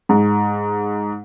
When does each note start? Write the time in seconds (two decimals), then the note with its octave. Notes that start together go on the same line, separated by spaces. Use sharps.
0.09 G#2